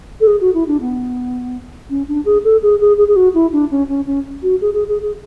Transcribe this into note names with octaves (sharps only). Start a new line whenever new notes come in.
A4
G#4
F#4
E4
D4
B3
C#4
D4
G#4
A4
G#4
G#4
G#4
G#4
F#4
E4
D4
C#4
C#4
C#4
F#4
G#4
G#4
G#4
G#4